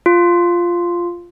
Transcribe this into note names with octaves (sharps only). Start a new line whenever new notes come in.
F4